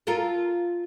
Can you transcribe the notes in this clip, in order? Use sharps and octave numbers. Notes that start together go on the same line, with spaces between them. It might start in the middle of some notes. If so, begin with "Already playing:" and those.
F4 A4 A#4